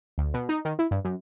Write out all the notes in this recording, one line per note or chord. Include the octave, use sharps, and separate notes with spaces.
D2
B2
D#4
D#3
E4
G2
F#2